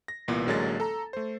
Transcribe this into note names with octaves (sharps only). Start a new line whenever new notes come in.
A#6
C2 A#2 E3 B3
A1 D3 F#3 G#3 A#3 A6
A4 A#5
A3 C5